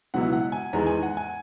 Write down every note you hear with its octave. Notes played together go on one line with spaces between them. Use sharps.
C#2 B2 F#3 B3 E4 F#5
F#5
G#5
E2 D#3 G#3 A#5
G#5
F#5
G#5